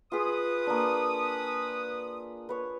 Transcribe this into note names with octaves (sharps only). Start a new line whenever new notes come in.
F4 G#4 B4 D#6
A#3 D4
B4 C#5